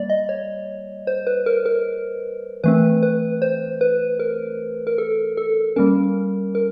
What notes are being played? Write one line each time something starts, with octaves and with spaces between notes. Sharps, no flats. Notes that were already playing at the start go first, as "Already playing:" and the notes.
Already playing: G3 A#3 D5
D#5
C#5
C5
B4
A#4
A#4
E3 A3 C4 B4
B4
C5
B4
A#4
A#4
A4
A4
G3 A#3 C#4 A#4
A#4